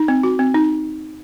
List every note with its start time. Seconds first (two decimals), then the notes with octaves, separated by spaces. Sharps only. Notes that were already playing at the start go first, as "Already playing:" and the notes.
Already playing: D#4
0.08 C4
0.23 F#4
0.39 C4
0.54 D#4